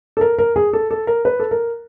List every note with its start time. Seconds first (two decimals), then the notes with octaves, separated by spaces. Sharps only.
0.17 A4
0.21 A#4
0.39 A#4
0.56 G#4
0.73 A4
0.91 A4
1.07 A#4
1.25 B4
1.40 A4
1.51 A#4